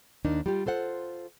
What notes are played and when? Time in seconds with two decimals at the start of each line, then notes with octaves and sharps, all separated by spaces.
0.25 D#2 D4 D#4 A#4
0.46 G3 F4 G4
0.66 F4 A4 C5 F#5